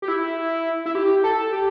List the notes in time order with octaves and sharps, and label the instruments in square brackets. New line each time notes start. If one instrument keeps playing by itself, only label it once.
[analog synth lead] G4
E4
E4
G4
A4
G4